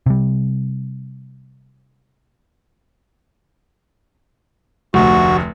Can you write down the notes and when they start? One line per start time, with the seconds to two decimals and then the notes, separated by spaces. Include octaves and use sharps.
0.06 C3 G3
4.94 F1 D2 F#4